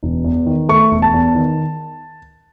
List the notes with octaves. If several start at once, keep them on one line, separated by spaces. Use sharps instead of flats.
E1
E2
D#3
A3 C#6
E1
A5
E2
D#3